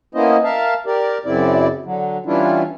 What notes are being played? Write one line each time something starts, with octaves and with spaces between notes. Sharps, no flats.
A#3 B3 C#4 E4 C5 D#5
A#4 E5 F5 A5
G4 A#4 D5
F#2 C#3 C4 E4 D5
D3 F#3
E3 G3 C#4 D4 E4 F4